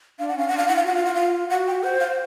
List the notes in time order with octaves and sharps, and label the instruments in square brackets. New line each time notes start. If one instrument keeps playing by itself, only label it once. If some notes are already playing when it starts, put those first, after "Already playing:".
[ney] D4 [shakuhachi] F5
[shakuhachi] F#5
[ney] C#4 [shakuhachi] F5
[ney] D4 [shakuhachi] F#5
[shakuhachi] F5
[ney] E4 [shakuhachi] F#5
[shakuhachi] F5
[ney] F4 F#4 [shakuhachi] F#5
[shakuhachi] F5
F#5
F5
[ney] F#4 [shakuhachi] F#5
[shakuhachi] G5
[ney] C5 [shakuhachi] F#5
[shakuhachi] F5